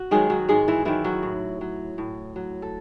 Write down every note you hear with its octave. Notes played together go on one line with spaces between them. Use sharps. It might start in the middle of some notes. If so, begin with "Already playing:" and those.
Already playing: F#4
D#3 F#3 G#3 G#4
F#3 F#4
G#2 G#3 G#4
E3 E4
D#3 E3 F#3 E4
F#3 F#4
A2
F#3
A2
F#3
A4